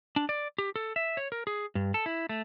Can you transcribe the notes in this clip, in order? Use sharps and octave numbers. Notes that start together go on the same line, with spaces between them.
D4
D5
G4
A4
E5
C#5
A#4
G#4
G2
A4
E4
A3